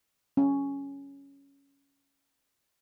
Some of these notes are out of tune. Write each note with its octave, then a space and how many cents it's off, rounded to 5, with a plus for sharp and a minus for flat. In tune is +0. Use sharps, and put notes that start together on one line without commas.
C#4 +5